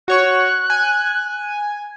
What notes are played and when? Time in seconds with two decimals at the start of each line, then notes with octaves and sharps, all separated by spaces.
0.08 F#4 C#5 C#6 F#6
0.70 G#5